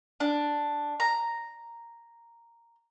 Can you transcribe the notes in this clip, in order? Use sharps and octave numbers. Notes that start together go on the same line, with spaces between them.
D4
A#5